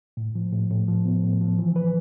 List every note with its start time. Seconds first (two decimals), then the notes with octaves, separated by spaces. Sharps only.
0.17 A2
0.35 F3
0.53 A2
0.71 A2
0.88 F3
1.05 B3
1.24 A2
1.41 F3
1.59 E3
1.76 B4